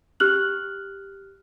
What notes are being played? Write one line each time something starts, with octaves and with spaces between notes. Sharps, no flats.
G4 F6 F#6 F#7